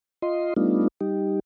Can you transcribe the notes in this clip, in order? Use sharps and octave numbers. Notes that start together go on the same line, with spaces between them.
F4 D#5 C6
G3 A3 B3 D4 D#4 F4
G3 D#4 G4